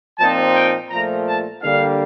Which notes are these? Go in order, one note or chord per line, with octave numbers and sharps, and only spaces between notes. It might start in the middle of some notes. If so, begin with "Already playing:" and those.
A#2 F3 C4 D#4 A5
G5
A#2 F3 A3 A#5
A5
D3 G3 A#3 D4 F5